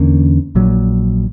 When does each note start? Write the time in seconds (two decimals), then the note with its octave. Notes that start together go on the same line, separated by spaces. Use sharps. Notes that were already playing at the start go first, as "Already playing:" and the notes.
Already playing: E2 D3 A#3 C#4
0.55 A#1 A#2 F#3